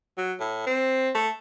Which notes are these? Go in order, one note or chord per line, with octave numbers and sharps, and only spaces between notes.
F#3
A2
C4
A3